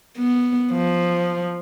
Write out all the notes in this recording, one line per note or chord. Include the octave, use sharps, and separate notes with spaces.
B3
F3